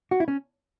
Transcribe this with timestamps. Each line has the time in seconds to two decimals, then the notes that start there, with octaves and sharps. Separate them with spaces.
0.11 F#4
0.20 E4
0.28 C#4